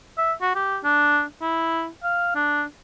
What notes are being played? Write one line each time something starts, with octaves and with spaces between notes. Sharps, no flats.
E5
F#4
G4
D4
E4
F5
D4